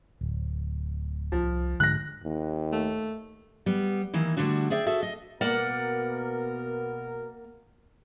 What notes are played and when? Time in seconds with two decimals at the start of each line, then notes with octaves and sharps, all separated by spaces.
0.21 D1
1.32 C2 F3
1.80 G#2 D3 G#3 F#6 A#6
2.24 D#2
2.72 A3
3.66 G3 B3
4.13 D#3 E3 A#3 E4
4.37 D3 G3 A3 D4 F#4
4.70 G#4 D5 E5 F#5 G5
4.86 F#4 G#4 A4 E5
5.03 D#5
5.41 B2 A#3 B3 A#4 D5 F#5